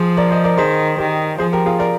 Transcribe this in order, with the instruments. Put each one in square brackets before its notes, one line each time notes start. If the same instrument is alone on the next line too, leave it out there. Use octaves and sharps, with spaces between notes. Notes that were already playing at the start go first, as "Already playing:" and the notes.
Already playing: [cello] F3 [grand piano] G#4 C5
[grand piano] A#4 D5
C5 D#5
A#4 D5
[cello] D#3 [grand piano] G#4 C5
[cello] D#3 [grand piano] G4 A#4
[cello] F3 [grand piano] G#4 C5
[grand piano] G4 A#4
F4 G#4
A#4 D5